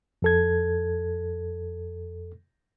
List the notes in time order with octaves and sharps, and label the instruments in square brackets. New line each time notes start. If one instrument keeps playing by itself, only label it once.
[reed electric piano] F2 A4 G#6